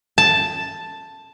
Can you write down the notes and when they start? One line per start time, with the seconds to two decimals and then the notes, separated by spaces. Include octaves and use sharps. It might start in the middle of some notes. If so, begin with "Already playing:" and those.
0.18 A5